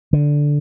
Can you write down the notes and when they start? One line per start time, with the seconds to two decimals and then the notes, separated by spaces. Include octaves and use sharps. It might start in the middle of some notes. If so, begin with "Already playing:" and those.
0.13 D3